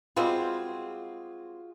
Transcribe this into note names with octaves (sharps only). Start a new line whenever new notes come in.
G3 G#3 C4 F4 F#4 G#4